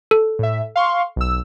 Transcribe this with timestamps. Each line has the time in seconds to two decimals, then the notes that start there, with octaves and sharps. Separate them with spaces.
0.11 A4
0.39 A2 E5
0.76 F5 C6 C#6
1.16 B1 E6